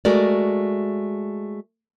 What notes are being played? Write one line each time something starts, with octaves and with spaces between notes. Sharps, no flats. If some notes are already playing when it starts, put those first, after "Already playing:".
G#3 A3 F#4 A#4 D5